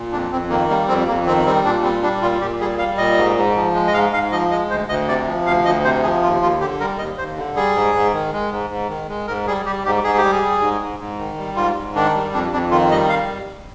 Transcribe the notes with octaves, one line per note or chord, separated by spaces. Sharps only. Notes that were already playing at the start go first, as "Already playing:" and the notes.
Already playing: A#2
F2 D4
F2 C4
D#3 A#3
G3 A#3
F2 C4
F2 A#3
D#3 C4
G3 C4
A#2 D4
G3 C4
G3 D4
A#2 F4
A#2 G4
G3 G#4
G3 F5
A#2 D#5
G#2
G#2
F3
G#3
D#5
G#2 F5
G#2 F5
F3 D#5
G#3 D#5
D2 C5
D2 D#5
C3 D5
F3
D2 F5
D2 D#5
C3 C5
F3 G#4
D#2 F4
D#2 F4
D3 G4
G3 A#4
D#2 D#5
D#2 C5
D3
G3 G#4
G#2
G#2
D#3
G#3
G#2
G#2
D#3
G#3
G#2 A#4
G3 G#4
G3 G4
G#2 G4
G#2 G#4
G4
G3
G#4
G3
G#2
G#2
G#2
D#3
G3
G#2 F4
G#2
D#3 D4
G3
F2 D4
F2 D4
D#3 F4
G3 D#5
F5